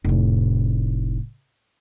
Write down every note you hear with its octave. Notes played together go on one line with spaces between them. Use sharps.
F1 A2